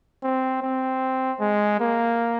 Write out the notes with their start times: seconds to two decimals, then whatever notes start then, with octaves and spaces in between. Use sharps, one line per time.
0.23 C4
0.63 C4
1.40 G#3
1.80 A#3